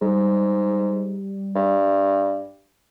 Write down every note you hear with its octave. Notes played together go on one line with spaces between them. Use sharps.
G#2 G3
G2